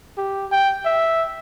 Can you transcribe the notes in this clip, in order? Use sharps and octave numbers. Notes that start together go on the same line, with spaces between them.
G4
G5
E5